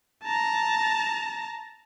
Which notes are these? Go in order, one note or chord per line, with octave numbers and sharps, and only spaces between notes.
A5 A#5